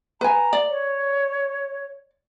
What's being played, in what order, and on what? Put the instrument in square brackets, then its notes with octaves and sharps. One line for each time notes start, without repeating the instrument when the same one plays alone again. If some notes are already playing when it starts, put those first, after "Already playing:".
[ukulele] B4 G#5 [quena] A#5
[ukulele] D5
[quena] C#5